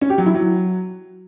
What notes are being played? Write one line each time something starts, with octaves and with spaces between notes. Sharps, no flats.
C#4
G4
F#3
E4
F#3